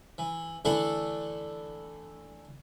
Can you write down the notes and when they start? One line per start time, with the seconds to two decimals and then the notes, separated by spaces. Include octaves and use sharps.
0.18 E3
0.65 D3 E3 A3 D4 E4 A4